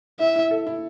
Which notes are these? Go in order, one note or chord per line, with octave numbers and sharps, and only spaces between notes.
E4 E5
E4
A4
E4